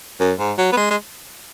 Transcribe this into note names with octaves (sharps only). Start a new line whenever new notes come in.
F#2
G#2
F#3
B3
G#3
G#3